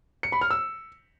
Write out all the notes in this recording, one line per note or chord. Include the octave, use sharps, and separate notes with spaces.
C#7
B5
F6
E6